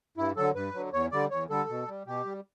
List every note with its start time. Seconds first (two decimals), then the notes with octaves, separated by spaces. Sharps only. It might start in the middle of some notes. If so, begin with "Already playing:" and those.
0.17 G2 E4
0.36 D3 F#3 A4
0.55 G2 B4
0.74 D3 F#3
0.93 E2 C#5
1.12 D3 G3 D5
1.31 E2 C#5
1.50 D3 G3 A4
1.69 B2
1.88 G3
2.07 B2 G4
2.25 G3